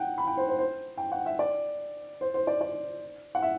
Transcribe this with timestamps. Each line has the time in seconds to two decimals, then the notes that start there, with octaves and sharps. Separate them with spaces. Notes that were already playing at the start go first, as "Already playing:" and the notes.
Already playing: F#5 G5
0.18 B5
0.27 G5
0.37 C5
0.49 C5
0.59 C5
0.97 G5
1.12 F#5
1.26 E5
1.39 D5
2.21 C5
2.34 C5
2.47 D5
2.61 D5
3.35 F#5
3.42 E5